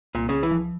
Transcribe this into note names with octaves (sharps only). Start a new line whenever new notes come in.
C2 A#2
C2 C#3
E3
F3